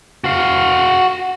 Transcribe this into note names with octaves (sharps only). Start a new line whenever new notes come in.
F#4 F5